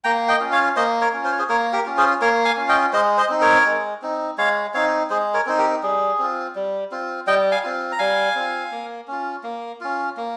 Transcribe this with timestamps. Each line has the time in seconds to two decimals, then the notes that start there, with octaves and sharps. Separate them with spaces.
0.04 A#3 G5 A#5
0.28 D#5 G5
0.40 C#4 F4
0.52 C#5 F5
0.76 A#3 C5 D#5
1.01 A#4 C#5
1.13 C#4 F4
1.24 C5
1.32 C#5
1.39 G#4 C5
1.49 A#3 A#4 C#5
1.73 G4 A#4
1.85 C#4 F4
1.97 G#4 C5
2.21 A#3 A#4 C#5
2.45 F5 G#5
2.57 C#4 F4
2.69 D#5 G5
2.93 G#3 C5 D#5
3.17 C5 D#5
3.29 C4 D#4
3.41 A#4 C#5
3.65 G#3
4.02 C4 D#4
4.38 G#3 C#5 F5
4.74 C4 D#4 C#5 F5
5.10 G#3 G#4 C5
5.34 A#4 C#5
5.46 C4 D#4 C5
5.58 G4 A#4
5.83 G3 G#4
6.19 C4 F4
6.55 G3
6.91 C4 F4
7.27 G3 D#5 G5
7.52 F5 G#5
7.63 C4 F4
7.92 A#5
7.99 G3 F5 G#5
8.35 C4 F4
8.72 A#3
9.07 C#4 F4
9.43 A#3
9.81 C#4 F4
10.17 A#3